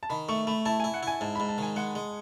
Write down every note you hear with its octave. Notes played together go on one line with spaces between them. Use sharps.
A5
D#3 B5
A3 C#6
A3 B5
E4 A5
E4 G#5
F#5
E4 G#5
G#2 A5
G#2 B5
A5
D#3 G#5
G#3 F#5
G#3